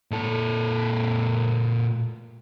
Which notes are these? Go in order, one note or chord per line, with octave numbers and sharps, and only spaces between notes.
A#2 A4